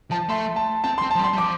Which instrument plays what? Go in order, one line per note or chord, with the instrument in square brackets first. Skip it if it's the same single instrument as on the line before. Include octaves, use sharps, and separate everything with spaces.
[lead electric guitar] F3 [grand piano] A5
[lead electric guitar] A3 [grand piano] C6
[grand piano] A5
[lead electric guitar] C4 [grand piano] A5
[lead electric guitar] C4 [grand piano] C6
[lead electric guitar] F3 [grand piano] A5
[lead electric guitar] G3
[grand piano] C6
[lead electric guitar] G3
[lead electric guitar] F3 [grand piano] D6